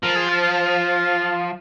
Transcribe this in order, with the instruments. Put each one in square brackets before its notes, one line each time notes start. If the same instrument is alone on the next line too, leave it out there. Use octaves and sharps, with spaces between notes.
[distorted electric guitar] F3 [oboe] A#4
[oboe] G#4
F4
F4
F4